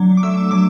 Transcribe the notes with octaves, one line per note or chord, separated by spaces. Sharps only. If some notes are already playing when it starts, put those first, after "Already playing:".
Already playing: F#3 D4
D6
A3 E6
F#3 D6